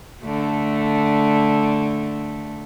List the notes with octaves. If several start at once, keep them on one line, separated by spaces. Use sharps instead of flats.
D3 A3